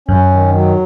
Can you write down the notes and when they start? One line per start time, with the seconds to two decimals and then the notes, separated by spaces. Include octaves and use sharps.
0.08 F#2 C#4
0.31 D#3
0.54 F#3